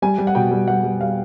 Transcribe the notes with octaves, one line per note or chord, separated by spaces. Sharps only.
G3 G#5
G3
F#5
B2 G5
G3
G3 F#5
G3
G3 F5